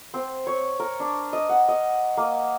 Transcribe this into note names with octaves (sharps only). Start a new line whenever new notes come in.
C4
C#5
A#4
D4
D#5
F#5
D#5
A#3